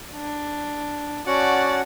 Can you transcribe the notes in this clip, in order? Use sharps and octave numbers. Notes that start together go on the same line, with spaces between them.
D4
C#4 F#4 D5 F#5 A5